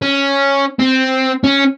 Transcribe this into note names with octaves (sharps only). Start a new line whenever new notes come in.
C#4
C4
C#4